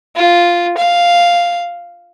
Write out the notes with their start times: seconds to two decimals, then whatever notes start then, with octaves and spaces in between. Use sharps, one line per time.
0.16 F4
0.78 F5